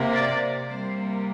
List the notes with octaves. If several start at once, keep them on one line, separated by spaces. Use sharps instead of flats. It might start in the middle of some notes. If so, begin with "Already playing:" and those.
Already playing: C3 A#3
D5
C3 G3 A#3 C5